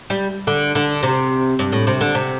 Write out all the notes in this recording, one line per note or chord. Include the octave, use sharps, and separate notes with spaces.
G3
D3
D3
C3
G2
A2
C3
D3
C3